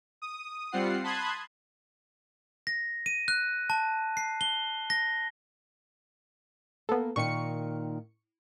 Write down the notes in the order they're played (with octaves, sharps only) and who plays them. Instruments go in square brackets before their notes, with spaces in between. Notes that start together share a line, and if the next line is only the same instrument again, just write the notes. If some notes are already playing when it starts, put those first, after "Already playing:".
[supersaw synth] D#6
G3 C4 F4 F#5 C7
A5 B5 C6 D#6 F#6 G#6
[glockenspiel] A#6
D#7
F#6
A5
C7
G7
A#6
[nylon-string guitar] A#3 [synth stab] B3 A4
[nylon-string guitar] A#2 D#3 G5 [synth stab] C#6 C#7